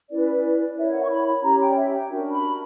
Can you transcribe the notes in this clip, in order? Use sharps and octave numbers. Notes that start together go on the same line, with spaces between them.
C#4 E4 B4 D5
E4 A#4 C#5 E5
F#5
C#6
B5
B5
C#4 G4 C#5 A#5
G5
D5
E5
G5
D4 F#4 A#4
B5